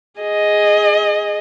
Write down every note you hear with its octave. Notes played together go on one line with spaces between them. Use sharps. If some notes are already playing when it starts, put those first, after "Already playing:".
G#4 D#5